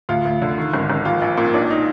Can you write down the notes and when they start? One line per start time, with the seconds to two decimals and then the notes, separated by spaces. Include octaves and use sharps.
0.09 D2 F4
0.25 D2
0.42 D3
0.58 D#3
0.73 G#1
0.90 G#1
1.05 A#1 F4
1.22 A#1
1.37 A#2
1.54 B1 D4
1.70 D#4